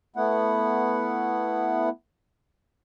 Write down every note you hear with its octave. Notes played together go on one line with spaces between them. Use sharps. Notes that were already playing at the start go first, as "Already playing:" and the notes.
A3 B3 E4 F#5